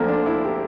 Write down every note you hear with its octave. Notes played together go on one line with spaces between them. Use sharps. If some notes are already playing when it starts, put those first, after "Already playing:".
Already playing: D2 D3 F3 A#3 C4
D4
E4
G4